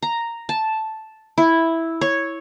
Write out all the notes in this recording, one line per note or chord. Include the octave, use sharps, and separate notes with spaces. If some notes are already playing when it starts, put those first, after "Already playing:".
A#5
A5
E4
C#5